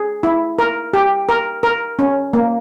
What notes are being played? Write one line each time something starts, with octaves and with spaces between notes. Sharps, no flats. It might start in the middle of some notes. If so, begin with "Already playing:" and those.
Already playing: G#4
E4
A#4
G4
A#4
A#4
C#4
A#3